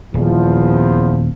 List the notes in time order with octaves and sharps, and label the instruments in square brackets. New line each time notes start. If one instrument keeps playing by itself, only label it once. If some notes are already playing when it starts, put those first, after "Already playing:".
[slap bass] D#1 [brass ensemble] E2 F3